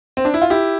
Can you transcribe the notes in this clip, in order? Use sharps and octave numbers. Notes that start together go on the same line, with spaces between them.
C4
D4
E4
F4
E4 G4